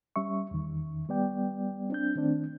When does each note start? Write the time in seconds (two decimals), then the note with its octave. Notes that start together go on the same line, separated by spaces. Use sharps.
0.16 G3 C#4 E5 C#6
0.51 E2 D#3
1.09 G3 B3 D5 G5
1.90 C4 D4 G6
2.16 D#3 A3 C4 D4